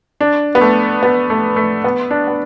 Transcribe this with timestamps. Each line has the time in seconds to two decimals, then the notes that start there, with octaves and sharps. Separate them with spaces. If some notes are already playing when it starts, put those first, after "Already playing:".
0.21 D4
0.55 B3
0.61 A3
1.03 B3
1.30 A3
1.56 A3
1.84 B3
2.11 D4
2.28 B3